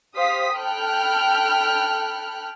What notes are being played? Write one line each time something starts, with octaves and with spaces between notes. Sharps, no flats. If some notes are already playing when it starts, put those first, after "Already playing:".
G4 C5 F5 D#6 B6
A4 G5 B5 F6 F#6